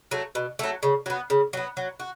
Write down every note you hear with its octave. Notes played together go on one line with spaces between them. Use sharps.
F#3 A3
B2
F#3 A3
C#3
F#3 B3
C#3
F#3 B3
F#3
F#4